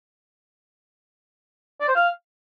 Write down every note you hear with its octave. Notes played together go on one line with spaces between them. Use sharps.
D5
C5
F5